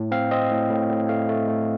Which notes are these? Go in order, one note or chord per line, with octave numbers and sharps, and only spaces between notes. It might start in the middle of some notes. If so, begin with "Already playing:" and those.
Already playing: A2
C4 F5
C4 D#5
A2
A2
A2
A3 F5
A3
A3